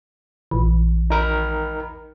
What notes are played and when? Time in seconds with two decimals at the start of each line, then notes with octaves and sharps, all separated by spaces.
0.51 A#1 E3
1.10 D#4 A#4 B5